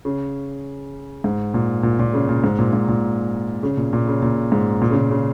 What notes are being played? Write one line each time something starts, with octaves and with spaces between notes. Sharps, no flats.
C#3
G#2
A#2
A#2
A#2
C#3
A#2
G#2
A#2
G#2
A#2
C#3
A#2
A#2
C#3
A#2
G#2
A#2
C#3
A#2
C#3